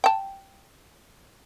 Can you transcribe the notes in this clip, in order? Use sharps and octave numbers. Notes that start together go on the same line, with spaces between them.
G5 A5